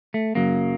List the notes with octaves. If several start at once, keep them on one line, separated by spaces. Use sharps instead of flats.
A3
F#2 C#3 F#3 A#3